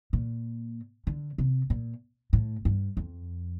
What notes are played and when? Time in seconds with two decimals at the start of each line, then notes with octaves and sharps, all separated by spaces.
0.13 A#2
1.07 D3
1.38 C3
1.70 A#2
2.33 A2
2.65 G2
2.97 F2